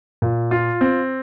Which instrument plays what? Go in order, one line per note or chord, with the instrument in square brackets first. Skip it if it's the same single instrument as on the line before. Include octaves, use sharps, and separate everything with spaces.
[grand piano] A#2
F4
C4